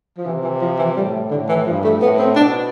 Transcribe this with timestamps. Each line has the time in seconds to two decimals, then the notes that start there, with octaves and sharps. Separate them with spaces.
0.18 F3
0.26 C3 E3
0.44 E3
0.61 F3
0.79 E3
0.96 A2 G3
1.31 A2 D3
1.49 E3
1.66 G2 F3
1.84 A3
2.01 A2 B3
2.19 C4
2.36 B2 D4